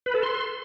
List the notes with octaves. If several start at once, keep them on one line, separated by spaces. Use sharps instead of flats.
B4
A4
C6